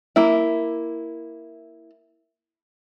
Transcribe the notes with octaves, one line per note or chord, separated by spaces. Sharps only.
A#3 E4